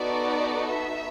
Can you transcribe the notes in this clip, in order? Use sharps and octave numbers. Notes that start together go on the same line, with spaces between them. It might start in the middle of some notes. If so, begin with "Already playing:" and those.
Already playing: B3 D#4 F#4 A4 D5
E5